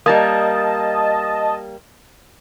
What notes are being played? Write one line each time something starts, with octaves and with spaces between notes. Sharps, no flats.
G3 A#3 D#5 A5